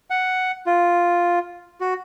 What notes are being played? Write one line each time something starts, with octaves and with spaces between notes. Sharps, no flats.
F#5
F4
F#4